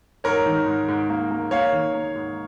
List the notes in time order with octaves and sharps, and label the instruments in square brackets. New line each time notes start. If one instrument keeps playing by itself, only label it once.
[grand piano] G#2 A#4 C#5
D#3
G#2
G#2
A#3
A#3
A#3 C#5 F5
D#3
A#3
G#2